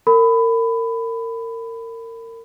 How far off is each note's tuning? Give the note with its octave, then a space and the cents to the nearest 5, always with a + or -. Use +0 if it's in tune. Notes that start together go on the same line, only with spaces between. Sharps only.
A#4 -30 B5 +20